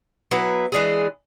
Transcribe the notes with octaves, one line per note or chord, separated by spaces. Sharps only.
F#3 B3 E4 B4
E3 G#3 D4 G#4